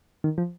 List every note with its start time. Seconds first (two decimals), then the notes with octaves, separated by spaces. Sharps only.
0.24 D#3
0.38 F3